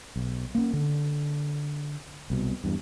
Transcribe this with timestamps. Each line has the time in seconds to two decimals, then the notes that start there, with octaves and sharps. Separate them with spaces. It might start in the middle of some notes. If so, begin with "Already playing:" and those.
0.16 B1
0.55 A#3 C#4
0.73 D3
2.30 C2 B2
2.64 E2 G2